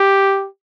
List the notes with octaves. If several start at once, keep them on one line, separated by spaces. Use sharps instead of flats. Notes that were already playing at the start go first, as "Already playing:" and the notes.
Already playing: G4